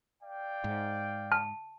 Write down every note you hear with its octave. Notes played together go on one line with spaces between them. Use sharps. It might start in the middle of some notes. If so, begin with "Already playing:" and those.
D5 F5 G5
G#2
A5 F6